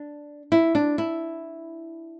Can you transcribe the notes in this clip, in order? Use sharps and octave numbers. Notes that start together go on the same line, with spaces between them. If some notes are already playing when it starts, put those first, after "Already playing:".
Already playing: D4
E4
D4
E4